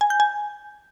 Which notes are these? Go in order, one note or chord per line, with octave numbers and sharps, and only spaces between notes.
G#5
G6
G#5